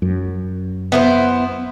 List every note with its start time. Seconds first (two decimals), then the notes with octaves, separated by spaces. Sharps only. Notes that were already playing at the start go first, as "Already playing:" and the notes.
0.02 F#2
0.92 B3 E4 C5